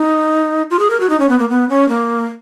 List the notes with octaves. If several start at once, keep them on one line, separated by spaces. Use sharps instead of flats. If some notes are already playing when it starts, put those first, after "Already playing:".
Already playing: D#4
F4
G#4
A#4
F#4
D#4
C#4
B3
A#3
B3
C#4
A#3